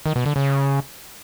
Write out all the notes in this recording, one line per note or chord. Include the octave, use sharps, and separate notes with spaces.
D#3
B2
D3
C#3